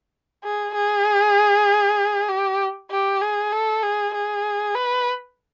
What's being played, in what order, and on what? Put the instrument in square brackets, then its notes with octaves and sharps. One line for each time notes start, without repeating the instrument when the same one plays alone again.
[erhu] G#4
G#4
G4
G4
G#4
A4
G#4
G#4
B4